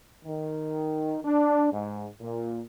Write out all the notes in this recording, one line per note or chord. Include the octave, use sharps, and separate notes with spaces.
D#3
D4
G#2
A#2